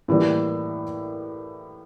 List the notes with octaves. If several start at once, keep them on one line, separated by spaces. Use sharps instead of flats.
A2 E3 G3 A#3